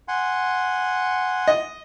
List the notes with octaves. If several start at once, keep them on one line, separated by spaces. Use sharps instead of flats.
F#5 G#5 C6
D#5